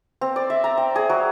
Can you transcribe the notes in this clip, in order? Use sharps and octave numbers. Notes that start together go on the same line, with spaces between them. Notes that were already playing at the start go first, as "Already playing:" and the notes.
C4
D5
E5
A#5
G5
G#4
F#3